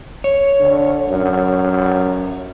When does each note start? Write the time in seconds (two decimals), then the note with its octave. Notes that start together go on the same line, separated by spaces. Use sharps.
0.24 C#5
0.60 D3
1.08 F#2